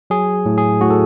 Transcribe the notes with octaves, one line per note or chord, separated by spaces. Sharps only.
F#3 G#4
A2
G#4
A2 F#4
A4